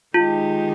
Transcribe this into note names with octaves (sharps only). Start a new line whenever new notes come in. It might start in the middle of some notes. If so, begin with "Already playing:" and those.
D#3 G#3 D#4 F4 G4